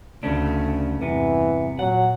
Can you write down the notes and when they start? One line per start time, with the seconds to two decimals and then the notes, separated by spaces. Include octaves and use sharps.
0.23 D2 C#3 A3 C#4 D4
1.02 E2 G2 C3 E3 B3
1.79 A#2 F#3 F#5